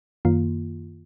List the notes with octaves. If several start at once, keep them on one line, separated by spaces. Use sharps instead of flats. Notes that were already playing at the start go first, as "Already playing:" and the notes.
F#2 D#3 A#3 F4